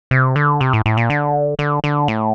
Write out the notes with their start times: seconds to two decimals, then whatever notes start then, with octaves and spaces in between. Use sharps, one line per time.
0.11 C3
0.36 D3
0.61 C3
0.73 A2
0.86 A2
0.97 A#2
1.10 D3
1.59 D3
1.84 D3
2.08 A2